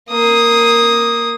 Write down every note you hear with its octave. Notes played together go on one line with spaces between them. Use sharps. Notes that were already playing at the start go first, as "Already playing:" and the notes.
A#3 D#6